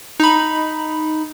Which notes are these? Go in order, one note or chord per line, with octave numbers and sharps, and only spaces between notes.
D#4 B5